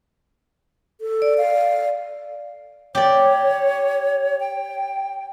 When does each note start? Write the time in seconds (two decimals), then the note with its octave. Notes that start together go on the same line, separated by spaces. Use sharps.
1.01 A4
1.22 D5
1.38 F5
2.95 G4 C#5 D5
4.40 G5